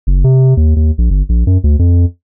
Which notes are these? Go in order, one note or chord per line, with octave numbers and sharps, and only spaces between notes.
F#1
C3
D#2
D#2
A#1
G1
A#1
F#2
D2
F2